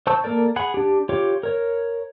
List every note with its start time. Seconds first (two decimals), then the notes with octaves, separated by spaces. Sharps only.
0.07 C5 A5 C#6 E6 G6
0.24 A#3 A4 A#4 D5
0.56 G#4 F#5 B5
0.74 D4 G4
1.09 F4 G4 C#5 D6
1.43 A#4 C#5